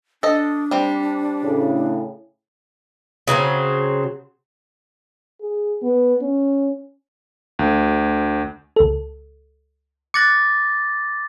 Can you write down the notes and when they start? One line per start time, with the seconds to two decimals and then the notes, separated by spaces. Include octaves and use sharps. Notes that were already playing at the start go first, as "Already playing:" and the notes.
0.23 D4 A4 D#5
0.71 G3 C4
1.43 A2 C#3
3.28 C#3 F#3 B3 C4
5.41 G#4
5.83 B3
6.21 C#4
7.59 D2
8.76 C#2 A4
10.14 D6 F#6 A6 A#6 C#7